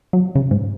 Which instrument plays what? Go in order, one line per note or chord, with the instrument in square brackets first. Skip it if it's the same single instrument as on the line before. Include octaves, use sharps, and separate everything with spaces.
[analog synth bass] F#3
C#3
G#2